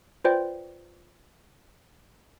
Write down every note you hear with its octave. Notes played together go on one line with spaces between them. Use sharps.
F4 B4 C5 D5 G5